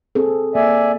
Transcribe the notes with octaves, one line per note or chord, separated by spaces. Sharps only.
C4 G#4 A4
A#3 D5 E5 G#5